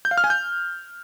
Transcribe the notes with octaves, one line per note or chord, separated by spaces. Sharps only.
G6
F5
F6
G#5
G6